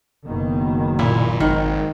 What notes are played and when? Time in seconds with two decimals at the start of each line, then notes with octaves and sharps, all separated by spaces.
0.25 F#1 B2 D#3
0.99 A#2 E4
1.40 G#1 D#3